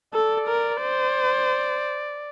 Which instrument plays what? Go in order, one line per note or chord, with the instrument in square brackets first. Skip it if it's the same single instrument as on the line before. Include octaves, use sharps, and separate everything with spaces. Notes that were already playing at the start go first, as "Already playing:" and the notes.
[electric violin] A4 [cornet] D5
[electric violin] A#4
C5